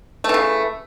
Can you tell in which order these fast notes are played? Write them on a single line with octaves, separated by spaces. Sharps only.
A3 E3 C#3